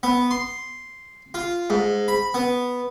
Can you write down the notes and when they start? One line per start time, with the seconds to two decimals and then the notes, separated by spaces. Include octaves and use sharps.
0.03 B3
0.31 C6
1.34 F4
1.70 G#2
2.08 B5
2.34 B3